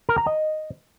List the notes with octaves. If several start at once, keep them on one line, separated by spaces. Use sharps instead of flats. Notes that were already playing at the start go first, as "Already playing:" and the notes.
A#4
A#5
D#5